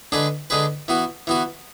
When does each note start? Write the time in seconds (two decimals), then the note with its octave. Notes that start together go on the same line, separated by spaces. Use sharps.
0.12 D3 G#3 D4 G#4 B4
0.50 D3 G#3 D4 G#4 B4
0.88 E3 B3 F#4
1.27 E3 B3 F#4